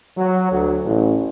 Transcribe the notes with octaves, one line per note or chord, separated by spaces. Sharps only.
F#3
D2
A1